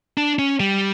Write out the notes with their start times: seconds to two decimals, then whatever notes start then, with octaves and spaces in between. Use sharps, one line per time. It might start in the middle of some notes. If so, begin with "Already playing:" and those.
0.17 D4
0.39 C#4
0.60 G3